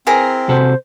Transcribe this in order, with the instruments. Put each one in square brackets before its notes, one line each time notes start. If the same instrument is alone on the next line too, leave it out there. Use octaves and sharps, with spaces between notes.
[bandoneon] C4 [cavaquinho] E4 G#4 A#4
[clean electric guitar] C3 F#4 A4 [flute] C5